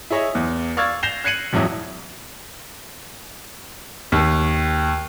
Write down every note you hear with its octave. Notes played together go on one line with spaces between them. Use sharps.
E4 G#4 C#5 D#5 E5
E2
D5 F5 C#6 E6 G#6 A6
G6 A#6 C7 E7 F7 G7
F#6 G#6 C7 C#7 D#7 F#7
E1 F2 G#2 F#3 E4
D#2